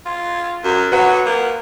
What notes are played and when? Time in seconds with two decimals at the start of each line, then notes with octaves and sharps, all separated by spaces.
0.06 F4
0.64 F#2
0.92 F#3 B4 F#5
1.26 A#3